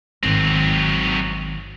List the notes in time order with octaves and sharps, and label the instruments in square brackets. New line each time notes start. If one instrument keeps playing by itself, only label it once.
[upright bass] G#1 D#3 [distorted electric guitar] F#3 C4